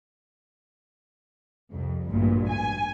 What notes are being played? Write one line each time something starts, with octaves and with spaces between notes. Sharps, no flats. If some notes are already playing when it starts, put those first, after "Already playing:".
C2 F2
A1 D2 G2 A#2
G#5